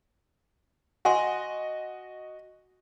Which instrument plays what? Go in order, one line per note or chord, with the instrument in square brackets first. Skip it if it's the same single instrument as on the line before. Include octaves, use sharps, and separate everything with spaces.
[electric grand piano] F#4 D#5 [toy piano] F#5 G#5 C6